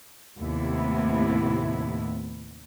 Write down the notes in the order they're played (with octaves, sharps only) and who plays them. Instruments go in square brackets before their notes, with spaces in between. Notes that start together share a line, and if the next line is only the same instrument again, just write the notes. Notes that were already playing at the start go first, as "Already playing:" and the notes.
[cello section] D#2 A2 C3 A3 B3 E4